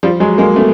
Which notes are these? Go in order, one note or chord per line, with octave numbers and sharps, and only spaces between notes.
F3 G3
F#3 G#3
G#3 A#3
A3 B3